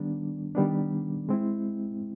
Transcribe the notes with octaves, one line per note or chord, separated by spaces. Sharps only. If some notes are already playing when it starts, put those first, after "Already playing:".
Already playing: D#3 G3 B3 D4
D#3 G3 B3 D4
G#3 C4 E4